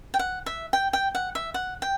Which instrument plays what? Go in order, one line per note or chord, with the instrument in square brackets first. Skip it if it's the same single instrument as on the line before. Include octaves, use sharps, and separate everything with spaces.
[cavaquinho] G5
F#5
E5
G5
G5
F#5
E5
F#5
G5